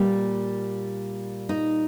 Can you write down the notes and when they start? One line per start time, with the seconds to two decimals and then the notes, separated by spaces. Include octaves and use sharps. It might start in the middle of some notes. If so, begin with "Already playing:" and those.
Already playing: A#2 G3 A#3
1.49 D#4